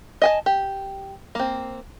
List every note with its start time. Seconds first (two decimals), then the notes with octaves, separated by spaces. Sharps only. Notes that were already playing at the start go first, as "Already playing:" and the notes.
0.22 D#5 G#5 A5
0.46 G4
1.35 A#3 C4